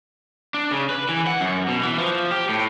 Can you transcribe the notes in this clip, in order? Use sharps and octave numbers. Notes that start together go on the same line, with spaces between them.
D4
C#3
B4
E3
F#5
F#2
B2
E3
F3
G4
A2